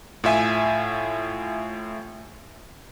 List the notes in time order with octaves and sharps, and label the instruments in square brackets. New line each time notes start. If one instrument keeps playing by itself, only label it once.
[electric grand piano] A2 F4 E5 G#5